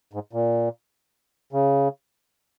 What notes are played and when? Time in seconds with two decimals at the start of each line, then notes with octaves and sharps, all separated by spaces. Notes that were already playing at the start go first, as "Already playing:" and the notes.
0.13 G#2
0.33 A#2
1.53 C#3